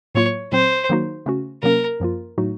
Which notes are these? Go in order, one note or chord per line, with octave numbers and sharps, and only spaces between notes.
A2 F#3 A#3 F4 C#5
A#2 F#3 C4 C5
D#3 F#3 A#3 D#4 F#4
C#3 A3 C#4 F#4
C3 F#3 A#3 C#4 A#4
F#2 F3 A#3 F4
A2 F#3 A3 D#4 F#4